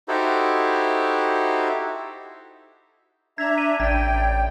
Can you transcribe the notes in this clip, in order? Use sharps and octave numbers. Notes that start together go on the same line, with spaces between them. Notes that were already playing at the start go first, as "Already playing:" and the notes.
D#4 E4 F#4 G4 A4 C5
D4 E5 A#5 G#6
D#7
A1 D5 G5 G#6